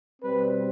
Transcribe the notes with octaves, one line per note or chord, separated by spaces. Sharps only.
B2 G3 C4 B4